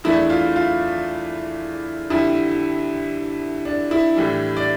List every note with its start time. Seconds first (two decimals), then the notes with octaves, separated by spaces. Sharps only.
0.04 E2 E3 A3 D4 E4
0.30 F4
0.56 F4
2.10 F2 D3 G3 E4
3.65 D4
3.91 E4
4.16 A2 E3 G3 D4
4.57 D5